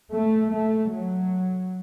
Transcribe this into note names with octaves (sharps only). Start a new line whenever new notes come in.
A3
A3
F#3